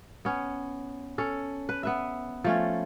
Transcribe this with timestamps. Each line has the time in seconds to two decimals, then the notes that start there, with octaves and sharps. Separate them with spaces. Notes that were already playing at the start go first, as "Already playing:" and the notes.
0.25 B3 C#4
1.18 C#4 A4
1.69 B4
1.83 B3 B4 E5
2.44 F3 A3 C#4